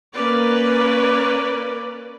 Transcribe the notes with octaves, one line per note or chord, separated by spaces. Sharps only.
A#3 C#4 B4 D5